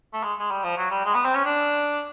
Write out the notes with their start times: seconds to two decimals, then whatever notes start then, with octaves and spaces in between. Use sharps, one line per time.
0.13 A3
0.23 G#3
0.39 G#3
0.51 G3
0.64 F3
0.77 F#3
0.91 G3
1.05 G#3
1.15 B3
1.25 C4
1.35 C#4
1.45 D4